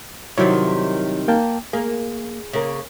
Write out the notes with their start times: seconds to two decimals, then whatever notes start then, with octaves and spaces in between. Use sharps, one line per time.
0.38 C3 D#3 F#3 G3 E4 C#5
1.28 A#3 G5 A5
1.73 A#3 G#4
2.53 C#3 A#3